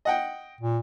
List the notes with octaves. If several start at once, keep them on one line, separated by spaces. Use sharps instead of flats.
D#5 F#5 G5
A#2